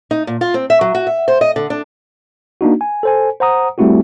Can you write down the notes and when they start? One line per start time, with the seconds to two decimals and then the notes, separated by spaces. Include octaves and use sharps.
0.11 D#4
0.27 A#2
0.41 F4
0.54 C4
0.70 E5
0.81 F#3
0.95 F#4
1.07 E5
1.28 C5
1.41 D#5
1.56 D3
1.70 D4
2.61 A#3 D4 D#4 F#4
2.81 G#5
3.03 A4 C5 G#5
3.40 C5 F#5 A#5 D#6
3.78 G3 A3 C4 E4 F#4 G4